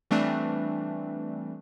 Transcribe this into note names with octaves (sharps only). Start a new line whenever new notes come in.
E3 G3 A3 C4 D4